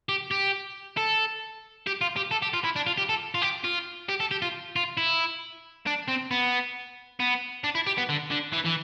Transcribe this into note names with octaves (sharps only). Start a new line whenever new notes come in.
G4
G4
A4
G4
F4
G4
A4
G4
F4
E4
D4
F4
G4
A4
F4
G4
F4
G4
A4
G4
F4
F4
E4
D4
C4
B3
B3
D4
E4
G4
B3
D3
D3
E3
E3